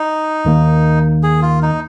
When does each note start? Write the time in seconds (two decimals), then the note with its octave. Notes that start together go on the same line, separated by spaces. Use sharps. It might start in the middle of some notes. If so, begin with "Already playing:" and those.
Already playing: D#4
0.45 D#2 D#3 A#3
1.23 G#4
1.42 F4
1.62 D#4